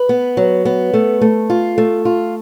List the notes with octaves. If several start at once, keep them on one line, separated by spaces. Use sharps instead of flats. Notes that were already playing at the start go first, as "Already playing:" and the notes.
Already playing: B4
B3
F#3
B3
A3
A3
F4
A3
F4